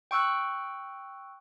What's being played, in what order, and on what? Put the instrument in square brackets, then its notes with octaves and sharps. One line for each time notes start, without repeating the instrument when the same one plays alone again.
[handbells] G5 C#6 E6 F#6